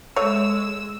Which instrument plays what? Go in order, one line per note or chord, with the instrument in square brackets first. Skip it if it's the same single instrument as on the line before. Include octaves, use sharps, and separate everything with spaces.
[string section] G#3 E6 [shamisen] A3 C#5